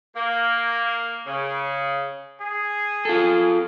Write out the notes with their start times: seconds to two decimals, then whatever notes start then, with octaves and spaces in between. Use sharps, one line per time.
0.16 A#3
1.26 C#3
2.41 G#4
3.05 F4 A4